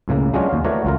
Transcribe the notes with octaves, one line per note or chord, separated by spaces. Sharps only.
C#2 A2 C#3 A#3
F#3 G#3 C#4 D4 F4 F#4
D#2 F5
E3 A3 F#4 A#4 C#5 D5
C#2 F4 A#4